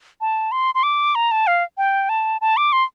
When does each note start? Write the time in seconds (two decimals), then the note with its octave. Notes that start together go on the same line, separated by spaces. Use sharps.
0.21 A5
0.52 C6
0.75 C6
0.83 D6
1.15 A#5
1.31 A5
1.47 F5
1.78 G5
2.09 A5
2.41 A5
2.57 D6
2.73 C6